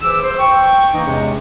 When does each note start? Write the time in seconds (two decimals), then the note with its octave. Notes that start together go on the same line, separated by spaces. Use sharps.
0.02 E3 G#4 B4 C5 D6 E6
0.22 C5
0.39 G5 C#6
0.94 E3 A#3 D#4
1.05 E2 C3 G#3 C#4